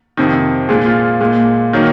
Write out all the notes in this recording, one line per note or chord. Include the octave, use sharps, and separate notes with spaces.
F2 C3 D#3
A#2 G#3 G#4
F4
A#2 G#3
D#3 F#3 A#3